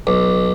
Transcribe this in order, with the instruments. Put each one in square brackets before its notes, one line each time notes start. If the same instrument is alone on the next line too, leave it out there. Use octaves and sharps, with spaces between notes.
[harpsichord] B1